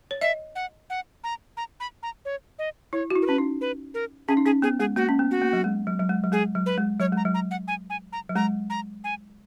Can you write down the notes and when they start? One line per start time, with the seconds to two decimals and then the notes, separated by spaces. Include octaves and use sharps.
0.11 C#5
0.21 D#5 E5
0.55 F#5
0.90 F#5
1.24 A#5
1.57 A#5
1.80 B5
2.03 A#5
2.25 C#5
2.59 D#5
2.93 E4 C#5
3.10 F#4
3.16 E4
3.22 A#4
3.26 C#4 B4
3.38 D#4
3.61 B4
3.94 A#4
4.28 C#4 G#4
4.37 D#4
4.46 C#4 G#4
4.62 B3 G#4
4.80 G#3 G#4
4.96 A#3 F#4
5.09 C#4
5.19 B3
5.31 F#4
5.42 A#3
5.53 F#3
5.64 G#3
5.87 F#3
6.00 F#3
6.09 G#3
6.24 F#3
6.32 G#3 G#4
6.55 F#3
6.66 B4
6.78 G#3
7.00 F#3 C#5
7.13 G#3 A#5
7.25 F#3
7.34 A#5
7.51 F#5
7.68 G#5
7.90 G#5
8.13 A#5
8.29 F#3
8.36 G#3 A#5
8.70 A#5
9.04 G#5